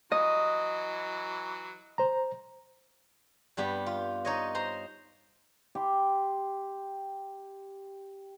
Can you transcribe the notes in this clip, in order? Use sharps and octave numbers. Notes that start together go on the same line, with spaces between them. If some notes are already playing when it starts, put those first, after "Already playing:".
E3 F#3 D#5
C5 A#5
G2 G3 B3 G4
F4
D#4 C#5 D#5
C5 A#5 C6
G4 C6